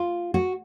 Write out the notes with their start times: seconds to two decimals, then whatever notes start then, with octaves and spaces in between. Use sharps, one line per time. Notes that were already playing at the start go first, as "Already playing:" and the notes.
Already playing: F4
0.34 F#4